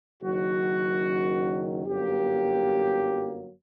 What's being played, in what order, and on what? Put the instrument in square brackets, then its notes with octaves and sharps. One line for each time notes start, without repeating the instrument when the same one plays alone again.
[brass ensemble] F#1 F#2 D#3 F#3 F#4
G1 F#2 F#3 A#3 G4